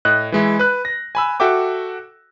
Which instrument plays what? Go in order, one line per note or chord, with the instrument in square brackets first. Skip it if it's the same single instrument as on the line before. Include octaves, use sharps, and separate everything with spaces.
[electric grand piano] A2 D#5 F#6
E3 G#3 E4
B4 F#6
A#6
G#5 B5 E6
F#4 A4 E5 G5 D6